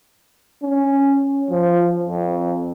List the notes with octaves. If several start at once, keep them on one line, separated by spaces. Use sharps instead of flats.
C#4
F3
F2